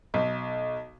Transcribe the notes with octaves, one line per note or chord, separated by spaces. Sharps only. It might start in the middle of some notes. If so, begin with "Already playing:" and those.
B1